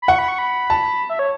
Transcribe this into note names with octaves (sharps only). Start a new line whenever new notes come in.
B5
F#5 C#6
B5
C#6
B5
A5
E5
C#5